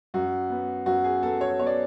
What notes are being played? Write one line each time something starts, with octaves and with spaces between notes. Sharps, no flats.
F#2 F#4
B3
F#2 F#4
G#4
B3 A4
C#5
B3 C#5
D5